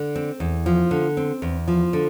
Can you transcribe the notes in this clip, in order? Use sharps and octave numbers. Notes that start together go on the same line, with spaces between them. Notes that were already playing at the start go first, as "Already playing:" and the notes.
Already playing: D3
C4
E2
F3
D3
C4
E2
F3
D3